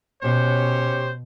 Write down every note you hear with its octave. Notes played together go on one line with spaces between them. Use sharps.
B2 C#4 G4 C5 C#5